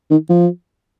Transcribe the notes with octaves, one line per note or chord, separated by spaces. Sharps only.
D#3
F3